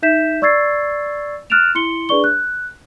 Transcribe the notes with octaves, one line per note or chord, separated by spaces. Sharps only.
D#4 E5 G6 B6 E7
D5 C#6 E6 G#6 A6 C7
F6 F#6 A6 D7 E7 F7
E4 C6 C#7 G7
D4 G#4 B4 D5 C#6 G7
F#6